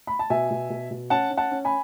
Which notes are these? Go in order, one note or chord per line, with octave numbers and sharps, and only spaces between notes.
B5
A5
B2 E5 G#5
B2
B2
B2
C#4 F#5 A5
C#4
F#5 A5
C#4
G#5 B5